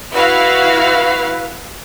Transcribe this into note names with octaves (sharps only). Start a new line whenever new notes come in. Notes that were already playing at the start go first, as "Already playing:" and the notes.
E4 F#4 B4 F5